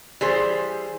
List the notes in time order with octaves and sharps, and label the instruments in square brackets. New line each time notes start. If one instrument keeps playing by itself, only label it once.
[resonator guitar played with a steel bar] E3 G3 G#4 C5